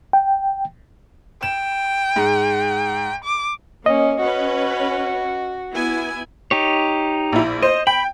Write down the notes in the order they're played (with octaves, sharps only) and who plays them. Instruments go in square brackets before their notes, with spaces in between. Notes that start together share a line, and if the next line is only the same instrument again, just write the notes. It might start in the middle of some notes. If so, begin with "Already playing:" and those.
[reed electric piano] G5
[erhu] G5 [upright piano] E7
[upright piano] G#2
[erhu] D6
[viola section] A#3 [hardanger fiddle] C#4 [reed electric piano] D#5
[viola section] C#4 B4 [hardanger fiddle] F#4
[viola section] B3 E4 G#5
[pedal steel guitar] D#4 G4 C#5
[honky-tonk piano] A#1 E4
[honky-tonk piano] C5 [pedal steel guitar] D#5
[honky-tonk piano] G5 [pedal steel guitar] B5